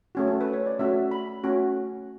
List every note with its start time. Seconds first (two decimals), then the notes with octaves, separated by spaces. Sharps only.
0.15 A3 C#4 F#4
0.28 A4
0.41 B4
0.53 C#5
0.66 D5
0.79 A3 C#4 F#4 E5
1.11 B5
1.44 A3 C#4 F#4